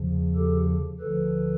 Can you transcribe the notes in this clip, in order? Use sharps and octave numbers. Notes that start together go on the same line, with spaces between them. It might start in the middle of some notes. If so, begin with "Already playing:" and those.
Already playing: E2 C#3 F3
G4 A4
D2 D3 F3 A4 B4